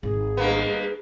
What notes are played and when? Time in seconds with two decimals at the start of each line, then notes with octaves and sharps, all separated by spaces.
0.03 G#1 D#3 G#4
0.37 G2 A#3 B3